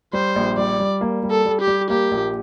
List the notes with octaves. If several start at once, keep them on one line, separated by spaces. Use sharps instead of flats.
G3 C5
A#1
G3 D5
G3
A#3
G3
A4
G3
G4
G3
A#3 G4
A#1